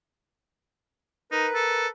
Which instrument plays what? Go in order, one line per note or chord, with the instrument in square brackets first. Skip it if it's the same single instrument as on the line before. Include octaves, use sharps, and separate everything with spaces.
[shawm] D#4 [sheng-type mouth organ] A#4 B4
[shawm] A4